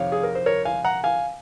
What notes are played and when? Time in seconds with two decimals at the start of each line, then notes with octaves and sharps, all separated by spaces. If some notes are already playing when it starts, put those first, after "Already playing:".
Already playing: F2 C3 D#3 C#5 F5
0.12 G#4
0.23 A#4
0.35 C5
0.46 A#4 C#5
0.65 F5 G#5
0.85 F#5 A#5
1.04 F5 G#5